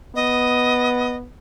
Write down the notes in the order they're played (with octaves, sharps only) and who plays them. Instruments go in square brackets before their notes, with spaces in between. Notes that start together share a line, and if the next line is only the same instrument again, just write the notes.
[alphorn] B3 [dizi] D#5